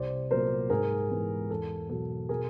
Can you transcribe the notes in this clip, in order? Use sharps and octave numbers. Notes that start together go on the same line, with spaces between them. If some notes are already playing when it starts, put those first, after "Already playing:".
Already playing: C2 C5 D5
A#2 F#3 B3 A#4 C5
G#2 G#4 A#4
E3 G#3 B3
E2 A4
B2 F#3 A4
B2 G#4 A#4